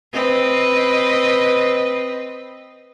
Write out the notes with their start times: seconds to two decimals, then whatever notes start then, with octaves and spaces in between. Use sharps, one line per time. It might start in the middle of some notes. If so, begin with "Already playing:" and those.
0.13 C4 B4 D#5